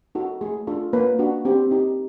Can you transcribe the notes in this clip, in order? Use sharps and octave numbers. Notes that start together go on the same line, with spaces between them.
D#4 F#4 A4
A3 G#4
D4 F4 A4
A#3 B4
D4 F#4
C4 G4
D#4 G4